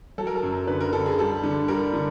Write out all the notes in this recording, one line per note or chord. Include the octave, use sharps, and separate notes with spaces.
F#3 A4
A#4
A4
F#2
D3 B4
A#4
D3 A4
G#4
G3 A4
D3
G3 A#4
D3